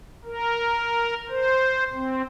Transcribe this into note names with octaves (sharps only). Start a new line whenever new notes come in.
A#4
C5
C4